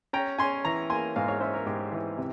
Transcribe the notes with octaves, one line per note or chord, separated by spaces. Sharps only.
C#4 G5 A#5
C#4 G#5 C6
E3 A#5 C#6
A#3 G#5 C6
G#2 F5 G#5
C#5 F5
C#4 C5 E5
A#4 C#5
G#2 G4
E3
C3